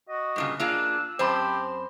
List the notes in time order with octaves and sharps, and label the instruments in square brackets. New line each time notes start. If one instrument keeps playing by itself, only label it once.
[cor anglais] F#4 [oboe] D#5
[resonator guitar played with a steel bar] G2 A#2 C#3
[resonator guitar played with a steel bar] A#3 F4 G#4 [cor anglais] D4 [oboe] E6
[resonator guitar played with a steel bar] F#2 C4 A5 [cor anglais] G4 [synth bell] C5 B5 C6